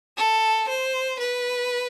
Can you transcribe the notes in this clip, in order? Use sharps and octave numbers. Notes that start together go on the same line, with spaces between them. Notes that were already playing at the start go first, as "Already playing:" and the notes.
A4
C5
B4